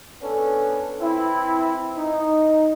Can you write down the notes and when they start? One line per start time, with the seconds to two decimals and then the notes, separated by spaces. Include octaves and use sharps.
0.22 B3 C#4 D4 A4
1.00 E3 C4 E4
1.98 D#4